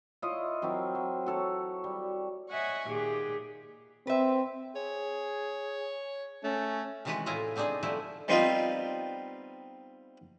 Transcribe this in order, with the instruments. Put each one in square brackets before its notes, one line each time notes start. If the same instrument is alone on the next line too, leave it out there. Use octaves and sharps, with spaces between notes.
[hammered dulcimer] E4 F4 C#5 D#5
F#3 C4 E4 A#4
F#3
F#4 A4 C#5
G3
[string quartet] C#5 D#5 E5 F#5 G#5 C#6
A#2 D#3 G4 G#4
[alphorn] C4 [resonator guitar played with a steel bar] B4 E5
[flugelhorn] G#4 [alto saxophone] C#5
[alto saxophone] A3 [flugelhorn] C#4
[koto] C3 D#3 E3 G#3 F#4 B4
A2 E4 F4 G#4 A#5
B3 C4 D4 D#4 G#4
F3 G3 A3 E4 B4
[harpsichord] G3 B3 C4 D#4 F4 B4